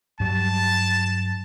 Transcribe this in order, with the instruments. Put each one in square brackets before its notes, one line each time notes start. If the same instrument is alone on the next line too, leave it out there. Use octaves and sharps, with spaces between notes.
[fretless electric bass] G2 F#3 G3 [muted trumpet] A5